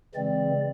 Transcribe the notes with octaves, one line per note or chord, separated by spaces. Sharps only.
C#3 E3 G#3 C4 D5